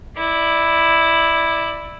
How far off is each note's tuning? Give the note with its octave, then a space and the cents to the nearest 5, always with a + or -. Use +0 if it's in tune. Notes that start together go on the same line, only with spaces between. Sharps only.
E4 +0 D5 +15